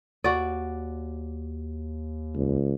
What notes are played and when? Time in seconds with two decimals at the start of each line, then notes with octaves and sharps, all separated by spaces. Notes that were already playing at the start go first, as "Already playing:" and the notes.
0.24 D#2 F#4 D5
2.35 C#2